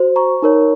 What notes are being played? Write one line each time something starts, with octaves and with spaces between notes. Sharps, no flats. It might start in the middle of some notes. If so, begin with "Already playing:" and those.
Already playing: F#4 C5
A#5 C#6
D#4 A#4 C#5